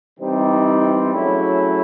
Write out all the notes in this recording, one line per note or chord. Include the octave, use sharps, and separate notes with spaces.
C3 E3 G3 C4 D#4
F#3 A3 C#4 E4 G#4